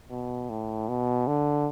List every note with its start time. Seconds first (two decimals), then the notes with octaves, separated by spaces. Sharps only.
0.10 B2
0.50 A2
0.89 B2
1.27 D3